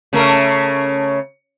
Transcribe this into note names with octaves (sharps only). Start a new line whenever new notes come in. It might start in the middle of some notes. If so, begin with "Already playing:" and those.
C#3 A3 A#4